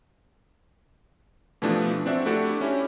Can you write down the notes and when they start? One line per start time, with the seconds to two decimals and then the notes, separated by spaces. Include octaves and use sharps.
1.62 B2 E3 F3 A3 D4 G4
2.06 C4 D4 F#4 E5
2.26 A3 D4 E4 F#4 G4 A4
2.61 C#4 E4 G4